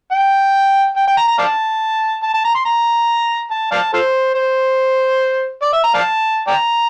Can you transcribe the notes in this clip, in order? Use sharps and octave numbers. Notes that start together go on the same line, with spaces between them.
G5
G5
G5
A#5
A#5
D5 F5 A5
A5
A5
A#5
C6
A#5
A5
D5 F5 A5
F4 A4 C5
C5
D5
E5
A#5
D5 F5 A5
D5 G5 A#5